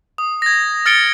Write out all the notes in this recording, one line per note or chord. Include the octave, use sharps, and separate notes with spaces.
D#6
G#6 A#6
F6 A6 C#7 D7 G7